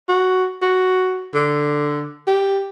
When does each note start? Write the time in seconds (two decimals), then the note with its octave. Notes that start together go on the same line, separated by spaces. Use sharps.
0.08 F#4
0.62 F#4
1.34 D3
2.27 G4